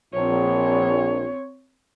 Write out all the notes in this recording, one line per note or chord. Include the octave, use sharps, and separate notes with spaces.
A#1 C4 C#5